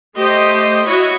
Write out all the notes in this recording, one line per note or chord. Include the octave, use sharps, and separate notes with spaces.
A3 G4 C5 D#5
E4 F#4 C#5 D#5